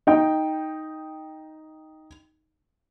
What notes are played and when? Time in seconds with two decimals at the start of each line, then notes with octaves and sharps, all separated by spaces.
0.07 D#4 G5